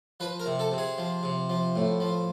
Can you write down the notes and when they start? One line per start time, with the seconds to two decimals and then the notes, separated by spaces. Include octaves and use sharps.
0.20 F3 B4
0.40 A#4
0.46 C3
0.59 A4
0.72 C3
0.78 G#4
0.98 F3
1.23 C3
1.49 F3
1.76 A2
2.00 F3